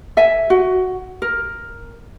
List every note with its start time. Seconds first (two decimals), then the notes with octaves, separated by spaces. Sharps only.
0.17 A4 E5 G#5
0.50 F#4
1.22 A#4